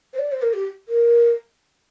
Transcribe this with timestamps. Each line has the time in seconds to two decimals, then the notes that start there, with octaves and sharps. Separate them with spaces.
0.13 C5
0.19 D5
0.32 C5
0.42 A#4
0.54 G4
0.88 A#4